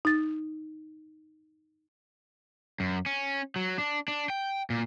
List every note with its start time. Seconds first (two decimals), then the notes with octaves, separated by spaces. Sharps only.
0.05 D#4 A6
2.80 F#2
3.06 C#4
3.56 F#3
3.78 D4
4.08 D4
4.30 G5
4.70 A#2